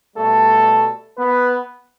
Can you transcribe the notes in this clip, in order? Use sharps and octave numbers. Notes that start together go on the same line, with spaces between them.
B2 G3 A3 A4
B3 B4